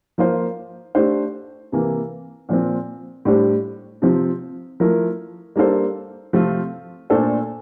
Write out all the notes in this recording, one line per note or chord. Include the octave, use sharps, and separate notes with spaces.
F3 A#3 F4 C5
A3 D4 G4 C5
C3 E3 A#3
A#2 F3 C4
A2 G3 D4 G4 C5
C3 F3 C4
F3 A3 E4 A#4
G3 A#3 D4 A4 C5
C3 F3 A3 C4 F4
A#2 A3 D4 A4 C5